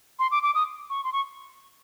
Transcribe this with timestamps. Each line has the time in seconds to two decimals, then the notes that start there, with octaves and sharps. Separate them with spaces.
0.19 C6
0.31 D6
0.43 D6
0.55 D#6
0.90 C#6
1.04 C6
1.13 C#6